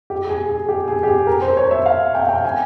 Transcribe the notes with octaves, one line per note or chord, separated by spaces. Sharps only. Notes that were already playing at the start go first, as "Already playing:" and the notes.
G4
G#4
G#4
G4
G#4
G4
G#4
A#4
C5
C#5
E5
F5
G5
F5
G5
G#5